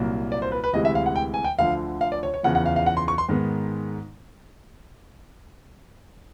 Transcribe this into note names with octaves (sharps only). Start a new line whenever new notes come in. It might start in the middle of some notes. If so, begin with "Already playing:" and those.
Already playing: C2 A#2 F#3 A#3
D5
C5
B4
B4
D2 C3 E3 G#3 D#5
E5
F5
F#5
G5
G#5
G5
D2 D3 F3 F5
F5
D5
C#5
C#5
E2 C#3 F3 F#5
F#5
F5
F5
F#5
C6
C#6
C6
G#2 D#3 G#3 B3